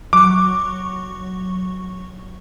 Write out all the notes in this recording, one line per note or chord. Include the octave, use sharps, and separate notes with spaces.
F#3 C#6 D6